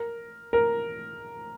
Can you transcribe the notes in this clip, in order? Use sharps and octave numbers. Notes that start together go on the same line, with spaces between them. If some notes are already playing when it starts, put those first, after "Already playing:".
Already playing: A#4
A#4